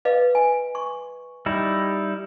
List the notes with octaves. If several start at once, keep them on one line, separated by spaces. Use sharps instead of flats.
B4 D#5 F5
G#5
C#6
G3 D#4 E4